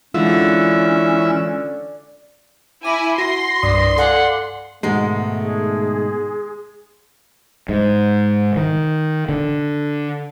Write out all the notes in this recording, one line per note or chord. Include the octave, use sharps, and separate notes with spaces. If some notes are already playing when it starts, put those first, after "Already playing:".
D3 E3 G#3 C#4 F4 E5
E4 G#5 D6 A#6
F#4 C6 A#6
C2 G2 D5 D#6
A4 D5 F5 F#5 G#5
G#2 B2 D#3 G#3 A3 F#5
G#4
G#2
D#3
D3